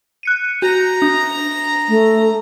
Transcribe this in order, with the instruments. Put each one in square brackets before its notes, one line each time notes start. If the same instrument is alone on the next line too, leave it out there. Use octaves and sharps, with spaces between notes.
[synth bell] F#6 C#7 D#7
[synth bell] F#4 [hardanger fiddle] A#5
[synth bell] D4
[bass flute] A3